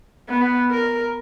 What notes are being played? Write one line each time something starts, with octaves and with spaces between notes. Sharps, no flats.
B3
A#4